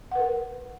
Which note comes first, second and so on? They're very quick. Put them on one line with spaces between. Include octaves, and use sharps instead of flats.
F#5 B4 A#4